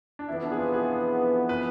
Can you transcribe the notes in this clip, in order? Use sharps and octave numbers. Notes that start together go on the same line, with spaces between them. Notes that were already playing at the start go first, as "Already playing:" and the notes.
D4
F2 E3 B3 E4
D4
G#4
F4
G#4
B4